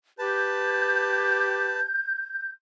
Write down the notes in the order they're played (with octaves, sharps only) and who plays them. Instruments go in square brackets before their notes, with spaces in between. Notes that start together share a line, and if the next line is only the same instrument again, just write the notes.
[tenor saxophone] G4 [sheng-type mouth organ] B4 A5 [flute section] G6